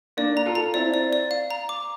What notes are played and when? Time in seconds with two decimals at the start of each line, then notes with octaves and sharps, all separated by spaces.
0.17 A#3 D4 D5
0.37 A#5
0.46 F4 A4
0.55 A#5
0.74 C4 E4 D5
0.94 D5
1.13 D5
1.31 F5
1.51 A#5
1.69 D6